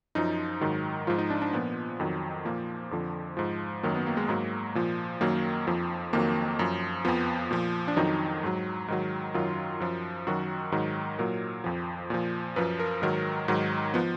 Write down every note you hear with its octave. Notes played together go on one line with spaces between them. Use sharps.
F#2 F3 D#4
G#2 D#3 F#3
G#2 F3 F4
D#4
D4
D4
A#2 F3 B3
F2 D#3 F#3
A#2 F3 A#3
F2 D3 F3
G#2 F3
F#2 D#3 F#3 A#3
B3
A#3
G#3
G#2 F#3 A#3
A#2 F3
F#2 D#3 F#3 A#3
F2 F3
F2 D#3 F#3 A#3
F#2 F3
F2 F3 B3
A#2 F3
D4
F2 D#3 F#3 D#4
G#2 F#3
G#2 D#3 F#3
F#2 D#3 F#3 F4
F#2 F3
F#2 D#3 F#3 F#4
G#2 D#3 F#3
A#2 F#3 A#4
F2 F3
A#2 F3
F#2 F3 B4
A#4
G#2 D#3 F#3 A#4
G#2 D#3 F#3
F3 B3